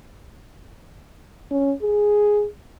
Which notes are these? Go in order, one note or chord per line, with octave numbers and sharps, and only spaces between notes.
C#4
G#4